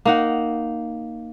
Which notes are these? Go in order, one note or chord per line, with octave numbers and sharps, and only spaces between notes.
A#3 D#4 F#5